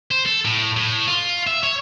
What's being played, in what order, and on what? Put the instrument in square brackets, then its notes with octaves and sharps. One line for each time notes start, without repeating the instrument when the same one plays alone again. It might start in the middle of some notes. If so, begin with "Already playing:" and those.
[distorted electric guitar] C5
A4
A2
A2
F4
E5
C#5